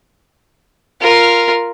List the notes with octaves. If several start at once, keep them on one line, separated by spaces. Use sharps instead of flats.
F4 A#4